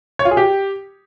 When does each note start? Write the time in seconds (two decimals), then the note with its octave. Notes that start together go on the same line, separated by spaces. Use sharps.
0.19 C#5
0.25 F4
0.31 G#4
0.37 G4